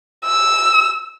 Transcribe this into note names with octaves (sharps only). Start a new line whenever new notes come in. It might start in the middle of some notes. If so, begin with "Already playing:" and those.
E6